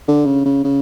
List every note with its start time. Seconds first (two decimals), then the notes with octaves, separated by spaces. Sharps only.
0.08 D3
0.26 C#3
0.46 C#3
0.64 C#3